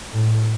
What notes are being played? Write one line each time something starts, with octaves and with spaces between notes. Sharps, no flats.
A2